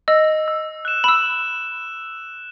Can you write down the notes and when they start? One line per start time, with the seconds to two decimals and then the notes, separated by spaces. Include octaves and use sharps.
0.08 D#5 E6
0.48 E6
0.85 F#6 E7
1.04 B5 E6 E7